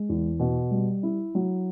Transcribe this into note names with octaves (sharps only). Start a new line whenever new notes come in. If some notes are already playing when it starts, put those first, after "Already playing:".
Already playing: G#3
E2
B2
G3
E4
F#3